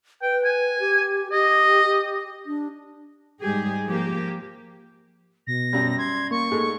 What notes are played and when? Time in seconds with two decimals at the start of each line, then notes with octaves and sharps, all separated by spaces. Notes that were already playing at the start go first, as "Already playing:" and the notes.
0.22 B4 G5
0.45 G#5
0.80 G4
1.32 G4 D#5
2.46 D4
3.41 G#2 G3 G4 G#4
3.87 F3 A#3 G4
5.47 B2 A#6
5.73 F#2 G3
5.98 C6 G#6
6.31 A#3 C#6
6.51 G#2 A3